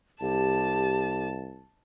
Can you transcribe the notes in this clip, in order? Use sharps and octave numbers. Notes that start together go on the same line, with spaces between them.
C2 G4 A5